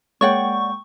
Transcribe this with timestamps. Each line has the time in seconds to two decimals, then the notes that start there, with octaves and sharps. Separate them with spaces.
0.21 G#3 A#3 C#5 D5 F#5 G5 C#6